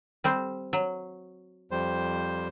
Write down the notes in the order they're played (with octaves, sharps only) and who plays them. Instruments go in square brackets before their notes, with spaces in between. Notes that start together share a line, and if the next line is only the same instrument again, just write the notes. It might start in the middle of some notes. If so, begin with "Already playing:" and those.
[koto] G3 C4 C5
F#3
[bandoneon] F2 G3 C5